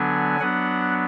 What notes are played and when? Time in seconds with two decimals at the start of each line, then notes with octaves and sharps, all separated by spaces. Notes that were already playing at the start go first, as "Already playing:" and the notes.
Already playing: D3 F#3 B3 D4 G#5
0.40 F#3 B3 D4 F#5